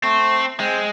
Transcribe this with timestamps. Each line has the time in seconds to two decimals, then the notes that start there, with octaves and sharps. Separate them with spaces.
0.04 A3 C4
0.60 G#3 C4